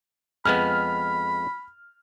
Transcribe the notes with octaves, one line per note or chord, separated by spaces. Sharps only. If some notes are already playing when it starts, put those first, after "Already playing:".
F2 G#3 B3 B5 F6